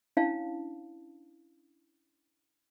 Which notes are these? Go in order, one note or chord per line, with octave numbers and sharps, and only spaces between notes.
C#4 D4 E4 C#5 F5 A5